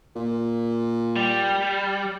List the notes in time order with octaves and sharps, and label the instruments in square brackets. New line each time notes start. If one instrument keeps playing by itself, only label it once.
[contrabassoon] A#2
[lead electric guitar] G3